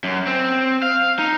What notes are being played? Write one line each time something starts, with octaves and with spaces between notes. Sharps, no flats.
F#2
C4
F5
D#4